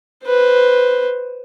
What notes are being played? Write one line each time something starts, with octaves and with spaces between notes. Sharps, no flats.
B4 C5